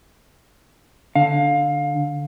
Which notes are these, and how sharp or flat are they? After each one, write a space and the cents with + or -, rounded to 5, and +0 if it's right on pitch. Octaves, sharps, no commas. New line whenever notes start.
D3 +0 F5 +20